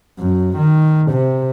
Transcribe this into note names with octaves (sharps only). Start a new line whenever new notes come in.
F#2
D#3
C3